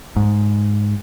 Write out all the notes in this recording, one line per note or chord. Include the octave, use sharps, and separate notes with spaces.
G#2